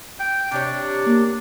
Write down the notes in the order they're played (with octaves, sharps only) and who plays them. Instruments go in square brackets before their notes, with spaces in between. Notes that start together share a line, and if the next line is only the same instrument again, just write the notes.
[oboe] G5
[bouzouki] C3 G4 C#5 [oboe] D4
[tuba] A#3